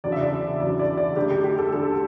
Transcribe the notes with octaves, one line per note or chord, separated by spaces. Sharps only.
F#1 E2 D3 F#3 D5
E5
D5
F#1 E2 D3 F#3 D5
D5
D5
D2 D3 G3 G4
G4
G4
A4
D2 D3 G3 A4